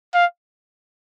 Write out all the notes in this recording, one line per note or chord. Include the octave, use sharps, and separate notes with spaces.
F5